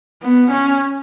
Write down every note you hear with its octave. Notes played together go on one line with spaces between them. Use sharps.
B3
C#4